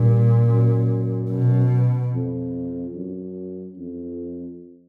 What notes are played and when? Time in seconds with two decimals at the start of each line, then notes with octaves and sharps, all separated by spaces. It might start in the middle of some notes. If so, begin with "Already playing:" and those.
Already playing: G2 A#2
0.48 F#2
1.31 B2
2.13 F2
2.95 F#2
3.78 F2